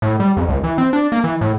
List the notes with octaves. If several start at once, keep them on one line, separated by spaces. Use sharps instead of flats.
A2
G3
F2
C#2
E3
C4
D4
A#3
E3
A2